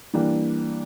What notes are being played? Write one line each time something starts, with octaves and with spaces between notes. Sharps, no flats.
E3 G3 A#3 D4 G4